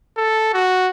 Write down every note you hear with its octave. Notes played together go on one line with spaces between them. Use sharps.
A4
F#4